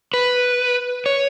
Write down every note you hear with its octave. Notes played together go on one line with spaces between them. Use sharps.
B4
C#5